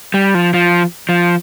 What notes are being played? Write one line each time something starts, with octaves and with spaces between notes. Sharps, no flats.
G3
F3
F3
F3